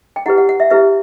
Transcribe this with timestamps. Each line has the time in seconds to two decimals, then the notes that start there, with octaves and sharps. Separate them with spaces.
0.16 G5
0.26 E4 G4 B4 F#5
0.38 F#5
0.49 F#5
0.60 E5
0.71 E4 G4 B4 E5